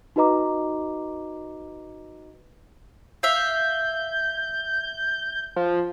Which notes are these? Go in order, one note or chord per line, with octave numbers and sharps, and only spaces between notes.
D#4 F#4 B4 D#5 A#5 D6
E5 F5 G6
F3